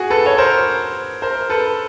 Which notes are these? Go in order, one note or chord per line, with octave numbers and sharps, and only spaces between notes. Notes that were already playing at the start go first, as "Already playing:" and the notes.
Already playing: F#4 G#4
A4 B4
C#5
A#4 C5
A#4 C5
A4 B4